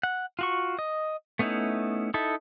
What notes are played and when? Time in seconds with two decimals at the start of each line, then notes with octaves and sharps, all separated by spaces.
0.03 F#5
0.39 F4 F#4 C#6
0.79 D#5
1.39 A3 B3 C#4 D#4 E4
2.14 D#4 E4 A4